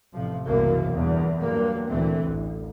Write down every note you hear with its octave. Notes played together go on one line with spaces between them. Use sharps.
A1 C3 F3
F#1 C2 F#2 B2 E3 A#3
E2 G2
G2 F#3 G3 A#3
D2 A#2 E3 A3 C4
A1 D2